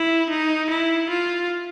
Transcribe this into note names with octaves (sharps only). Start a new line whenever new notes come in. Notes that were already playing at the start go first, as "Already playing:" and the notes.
Already playing: E4
D#4
E4
F4